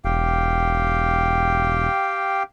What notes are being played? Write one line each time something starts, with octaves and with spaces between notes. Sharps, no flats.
E1 G4 F5 G5